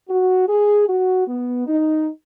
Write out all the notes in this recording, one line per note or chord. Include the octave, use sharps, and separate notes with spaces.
F#4
G#4
F#4
B3
D#4